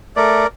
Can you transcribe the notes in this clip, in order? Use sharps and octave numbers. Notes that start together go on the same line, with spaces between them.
A3 A#4 D5